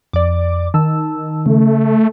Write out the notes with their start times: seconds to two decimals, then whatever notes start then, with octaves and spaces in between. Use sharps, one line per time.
0.13 F2 D5 D6
0.74 D#3 A5 E6
1.46 C#3 A3